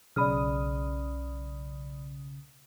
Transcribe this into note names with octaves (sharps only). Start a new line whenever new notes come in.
B1 C#3 D5 B5 D#6 F6